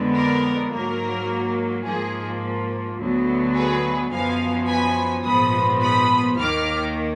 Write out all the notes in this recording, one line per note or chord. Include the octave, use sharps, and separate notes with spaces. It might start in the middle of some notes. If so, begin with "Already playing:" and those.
Already playing: F2 D3 G#3 B3
A#4 D5
G#2 F#3 A#3 A#4
G#2 F3 A#3 G#4
D2 D3 F#3 B3
G#4 B4
F#2 F3 B3 F5 G#5
G#5 B5
A#1 G#2 F3 B3 B5 D#6
B5 D#6
D#2 D#3 A#3 D6 F6